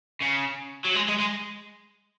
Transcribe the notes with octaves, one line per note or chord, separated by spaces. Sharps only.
C#3
F#3
G#3
G#3
G#3